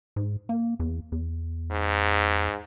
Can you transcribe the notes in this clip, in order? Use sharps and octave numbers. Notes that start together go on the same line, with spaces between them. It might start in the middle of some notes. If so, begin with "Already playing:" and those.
G#2
A#3
E2
E2
G#2